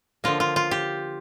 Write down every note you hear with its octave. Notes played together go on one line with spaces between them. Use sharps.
D3 F3 A#3 F4
F4
F4
G4